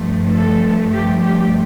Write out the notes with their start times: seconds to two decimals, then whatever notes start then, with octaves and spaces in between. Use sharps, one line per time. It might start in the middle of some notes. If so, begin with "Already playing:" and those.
Already playing: G2 F3 A3
0.31 A4
0.92 G4
1.23 G4